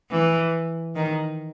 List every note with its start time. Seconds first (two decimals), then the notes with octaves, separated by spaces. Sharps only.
0.11 E3
0.96 D#3